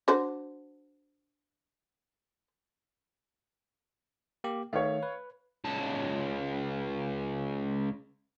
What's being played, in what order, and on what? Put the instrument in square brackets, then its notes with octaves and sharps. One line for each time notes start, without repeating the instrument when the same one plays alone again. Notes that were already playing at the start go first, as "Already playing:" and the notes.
[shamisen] D4 F#4 C5
[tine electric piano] A#3 G4
[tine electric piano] D#3 A3 [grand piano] C#5 F5
[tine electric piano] B4
[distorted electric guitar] C#2 A5